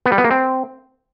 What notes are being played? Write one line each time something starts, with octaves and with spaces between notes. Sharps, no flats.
B3
G3
B3
A#3
C4